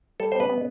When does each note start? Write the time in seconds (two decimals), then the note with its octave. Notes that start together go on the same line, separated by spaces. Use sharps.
0.20 G3 A4
0.32 C5
0.35 B3 B4
0.49 B3